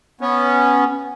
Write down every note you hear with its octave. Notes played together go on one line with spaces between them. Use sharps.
B3 C#4